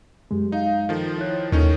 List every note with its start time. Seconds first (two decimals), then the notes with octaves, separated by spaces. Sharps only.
0.31 F#2 G#3 G4
0.52 D#4 F5
0.89 D#3 F3 A4
1.18 E4 C#5 F#6
1.52 D#2 D#3 C#4 D#4 A4